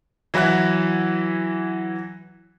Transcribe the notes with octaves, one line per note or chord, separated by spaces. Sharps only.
E3 F#3 E4 F#5 F#6